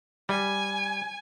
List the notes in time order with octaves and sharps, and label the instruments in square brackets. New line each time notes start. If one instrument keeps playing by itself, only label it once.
[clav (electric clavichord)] G3 [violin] G#5